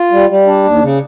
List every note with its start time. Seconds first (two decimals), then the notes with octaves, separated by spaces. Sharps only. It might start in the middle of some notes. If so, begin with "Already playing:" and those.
Already playing: F4
0.12 G3
0.29 G3
0.47 D4
0.65 D#2
0.82 C#3